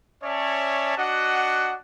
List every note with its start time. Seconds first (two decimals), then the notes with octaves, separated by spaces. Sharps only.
0.23 C#4 C#5 D5 E5 A5
0.98 D4 F#4 D#5 F#5